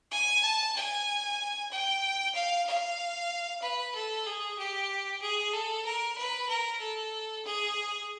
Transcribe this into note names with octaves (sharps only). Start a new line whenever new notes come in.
G#5
A5
G#5
G5
F5
F5
B4
A4
G#4
G4
G#4
A4
A#4
B4
A#4
A4
G#4